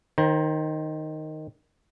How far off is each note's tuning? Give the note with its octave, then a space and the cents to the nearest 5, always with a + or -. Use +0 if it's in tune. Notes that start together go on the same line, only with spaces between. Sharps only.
D#3 +0 C5 +25 A#5 +30